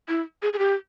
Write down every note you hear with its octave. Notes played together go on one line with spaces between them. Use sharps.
E4
G#4
G#4
G4